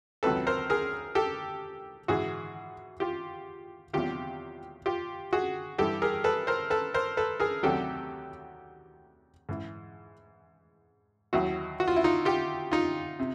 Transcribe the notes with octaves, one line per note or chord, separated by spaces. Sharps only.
C#2 C3 D#3 F#3 A4 B4
A#4 C5
G#4 A#4
G4 A4
G#2 E3 F#4 G#4
F4 G4
E2 C3 D#3 F#3 F4 G4
F4 G4
F#4 G#4
G2 E3 G4 A4
G#4 A#4
A4 B4
A#4 C5
A4 B4
A#4 C5
A4 B4
G#4 A#4
D2 C3 D#3 F#3 G4 A4
G#2 E3
D#2 D#3 F#3 E4 F#4
F#4
F4
E4
D#4 F4
F4 G4
D#4 F4
C3